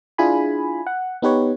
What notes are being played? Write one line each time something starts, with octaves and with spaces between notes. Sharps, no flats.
D4 E4 F4 G#4 G#5 B5
F#5
B3 D#4 G4 B4 C#5